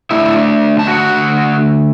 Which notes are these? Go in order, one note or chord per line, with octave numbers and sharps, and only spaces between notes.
D3 A3 D4 E4 E5
A5
F#4 F#5